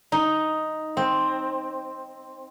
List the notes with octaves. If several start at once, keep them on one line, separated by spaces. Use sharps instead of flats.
D#4
C4